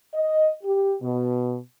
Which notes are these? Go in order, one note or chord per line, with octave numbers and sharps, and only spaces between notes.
D#5
G4
B2